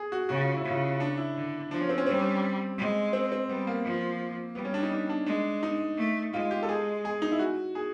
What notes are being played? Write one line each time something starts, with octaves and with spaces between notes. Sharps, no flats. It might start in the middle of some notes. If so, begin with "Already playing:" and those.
Already playing: G#4
F#4
C#3 F#4
F4
E4
C#3
F4
D4
E4
D3
F3 D4
C#4
C4
C#4
G3 C4
G#3
C4
C4
G3 B3
A#3
F3
G3 B3
C#4
D4
D#4
D4
D4
G#3 D4
D#4
A3
G#3 F4
G4
A4
G#4
G#4
D#4
E4
F#4
G#4